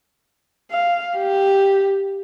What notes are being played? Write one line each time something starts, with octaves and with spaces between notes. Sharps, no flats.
F5
G4